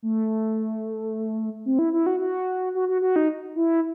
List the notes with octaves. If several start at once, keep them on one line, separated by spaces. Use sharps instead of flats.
A3
C4
E4
E4
F#4
F#4
F#4
F#4
F#4
D#4
E4